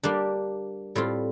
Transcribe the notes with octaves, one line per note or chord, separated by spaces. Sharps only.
G3 A#3 D4 G4
A2 G3 C4 F4